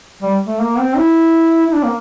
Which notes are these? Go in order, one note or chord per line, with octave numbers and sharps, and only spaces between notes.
G3
A3
A#3
C4
E4
E4
D4
A#3